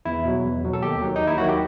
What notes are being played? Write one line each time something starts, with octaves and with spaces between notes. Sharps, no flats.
E2 E4
B2 F#3
E2
B2 F#3
A4
D#2 G4
D#3 F#3
D#4
D#2
E4
D#3 F#3 F#4
G4